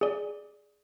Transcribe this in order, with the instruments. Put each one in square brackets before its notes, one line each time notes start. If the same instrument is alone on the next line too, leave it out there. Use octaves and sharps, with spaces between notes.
[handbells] G#4 D5